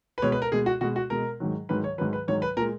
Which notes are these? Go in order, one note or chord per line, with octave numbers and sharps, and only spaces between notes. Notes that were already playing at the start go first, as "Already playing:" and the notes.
B4
B2 G#3 C#5
B4
A#4
B2 G#3 G#4
F#4
B2 G#3 F#4
F#4
B2 G#3 A#4
G#2 D#3 F#3
G#2 D#3 F#3 B4
C#5
G#2 D#3 F#3 B4
B4
G#2 D#3 F#3 C#5
B4
A#2 G#3 A#4